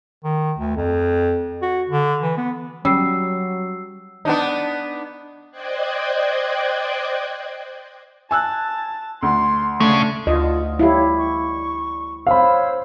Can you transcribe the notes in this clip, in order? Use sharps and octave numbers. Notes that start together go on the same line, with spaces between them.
D#3
D2
F2
F#4
D3
E3
B3
F#3 G3 C#4 E6 C7
B3 D4 D#4
C5 D5 D#5 G5 F#6 G#6
G#5 A5 E6 F#6
D2 C6
C#3 A3 D4
D2 F4 D#5
E4 G4 C#5 F5
C#6
C5 C#5 F5 B5 E6